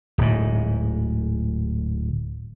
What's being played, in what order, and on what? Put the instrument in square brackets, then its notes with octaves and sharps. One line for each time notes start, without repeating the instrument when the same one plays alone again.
[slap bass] D1 G#2